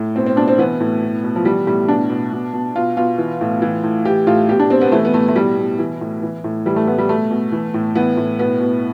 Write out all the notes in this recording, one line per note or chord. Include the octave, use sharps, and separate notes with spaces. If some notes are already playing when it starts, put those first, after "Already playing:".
Already playing: A2
B2 C4
C4
B2 D4
C4
E3 B3
A2
B2
B2
F3
E3 G3
A2 G3
B2 D4
B2
B2
B2
B2 F4
B2 F4
E3
A2
E3
A2
E3 G4
A2 F4
B2 G4
D4
B2 C4
B3
E3 A3
B3
A2 A3
A3
B2 G3
B2
E3
A2
E3
A2
E3 G3
A3
A2 B3
G3
B2 A3
B2
E3
A2
E3 B3
A2
B2 B3
B2